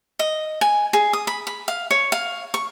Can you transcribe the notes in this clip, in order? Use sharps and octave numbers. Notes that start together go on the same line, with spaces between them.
D#5
G#5
G#4
D#6
B5
B5
F5
C#5
F5
C#6